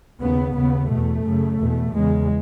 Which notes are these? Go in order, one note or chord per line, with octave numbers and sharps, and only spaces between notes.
D#2 C#3 B3
D#2 C#3 B3
E2 B2 A3
F#2 C#3
E2 B2
E2 C#3 G#3